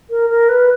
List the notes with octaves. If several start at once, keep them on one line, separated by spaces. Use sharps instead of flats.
A#4
A#4
B4